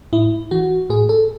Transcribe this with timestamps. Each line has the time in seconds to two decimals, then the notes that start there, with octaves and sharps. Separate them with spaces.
0.13 A2 E4
0.51 E3 F#4
0.90 A2 G#4
1.09 A4